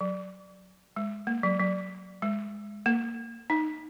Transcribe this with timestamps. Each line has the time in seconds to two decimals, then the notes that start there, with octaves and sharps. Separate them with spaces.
0.01 F#3
0.96 G#3
1.27 A#3
1.43 F#3
1.60 F#3
2.22 G#3
2.86 A#3
3.50 D#4